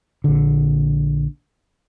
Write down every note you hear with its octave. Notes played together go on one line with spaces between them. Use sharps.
A#1 D3